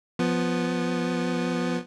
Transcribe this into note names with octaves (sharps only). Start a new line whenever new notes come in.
F3 B3